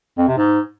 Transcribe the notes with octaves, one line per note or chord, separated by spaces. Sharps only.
F2
C3
G#2